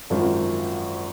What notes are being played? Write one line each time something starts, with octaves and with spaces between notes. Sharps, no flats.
G#1 F#2 F3